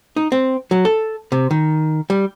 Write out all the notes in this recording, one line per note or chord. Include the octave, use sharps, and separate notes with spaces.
D#4
C4
F#3
A4
C3
D#3
G3